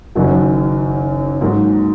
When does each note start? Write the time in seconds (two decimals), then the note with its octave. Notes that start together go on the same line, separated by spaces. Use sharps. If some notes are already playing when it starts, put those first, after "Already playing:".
0.15 F#1 F#2 D#3 F#3
1.41 G#2 F#3 A#3